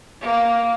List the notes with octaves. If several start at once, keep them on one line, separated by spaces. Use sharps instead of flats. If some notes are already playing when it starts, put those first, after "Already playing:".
A#3